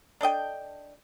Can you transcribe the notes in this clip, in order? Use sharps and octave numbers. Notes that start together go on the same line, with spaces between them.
D4 A4 D#5 G5